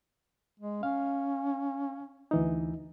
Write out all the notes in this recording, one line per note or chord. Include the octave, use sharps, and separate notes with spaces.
G#3
C#4 F5
D2 E3 D#4